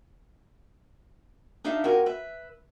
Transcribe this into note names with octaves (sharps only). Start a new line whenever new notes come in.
D4 D#4 G#4 E5 F5 A5
F2 F3 F#4 G4 A#4 G#5
B4 E5